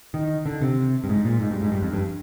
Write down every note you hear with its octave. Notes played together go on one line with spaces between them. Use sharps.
D#3
D3
C3
G2
G#2
A#2
G#2
G2
G#2
G2
F2
G2